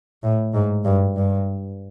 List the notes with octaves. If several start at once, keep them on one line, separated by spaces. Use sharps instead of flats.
A2
G#2
G2
G2